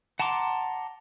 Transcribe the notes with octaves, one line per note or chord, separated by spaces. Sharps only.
F#5 A5 A#5 C6 D6